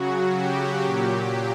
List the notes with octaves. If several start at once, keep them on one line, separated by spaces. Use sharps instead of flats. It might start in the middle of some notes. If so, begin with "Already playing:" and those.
Already playing: C#3 F#3 F#4
G4
A#2 F#3